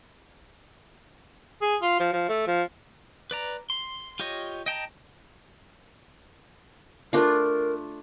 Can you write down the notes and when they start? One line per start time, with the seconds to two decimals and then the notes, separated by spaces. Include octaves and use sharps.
1.62 G#4
1.82 F4
1.99 F3
2.13 F3
2.29 A3
2.47 F3
3.31 B4 D5 A#5
3.70 C6
4.19 F4 G4 C#5 D#5
4.66 D#5 G5 A5 A#5
7.13 A3 D4 F4 A#4